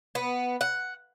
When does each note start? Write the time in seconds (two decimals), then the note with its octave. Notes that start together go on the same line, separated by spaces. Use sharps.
0.15 B3
0.61 F#5